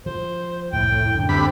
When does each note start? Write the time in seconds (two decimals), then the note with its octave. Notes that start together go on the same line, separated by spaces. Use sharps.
0.06 F3 C5
0.73 C2 F2 A2 G5
1.15 F#2 D3
1.29 D2 G3 C4 B5